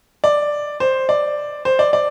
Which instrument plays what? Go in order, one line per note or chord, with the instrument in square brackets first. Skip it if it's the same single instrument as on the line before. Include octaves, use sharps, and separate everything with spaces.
[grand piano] D5
C5
D5
C5
D5
D5